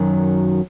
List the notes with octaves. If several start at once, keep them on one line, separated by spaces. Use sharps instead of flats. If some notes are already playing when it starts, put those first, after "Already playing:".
Already playing: F#2 D#3 F#3